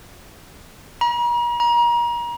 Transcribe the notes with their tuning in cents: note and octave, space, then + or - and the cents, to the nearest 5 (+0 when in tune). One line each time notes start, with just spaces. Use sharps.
A#5 +45
A#5 +35